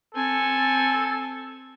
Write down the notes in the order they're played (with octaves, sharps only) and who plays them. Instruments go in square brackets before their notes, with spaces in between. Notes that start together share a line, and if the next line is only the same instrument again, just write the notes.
[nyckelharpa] C4 G#5 [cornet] A4